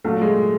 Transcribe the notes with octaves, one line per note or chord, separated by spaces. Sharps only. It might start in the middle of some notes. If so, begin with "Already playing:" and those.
A#2 F#3 A3
G#3